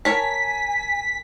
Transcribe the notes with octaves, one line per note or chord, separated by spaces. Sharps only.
A#4 C#5 G#5 A5 B6